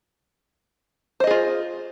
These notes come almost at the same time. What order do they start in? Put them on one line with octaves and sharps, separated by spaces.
C5 D#5 G#4 F4